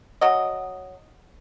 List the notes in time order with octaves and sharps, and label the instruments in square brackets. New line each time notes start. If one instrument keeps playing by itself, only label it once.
[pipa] F#3 F#4 D#5